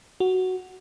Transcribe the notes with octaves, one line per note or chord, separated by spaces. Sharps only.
F#4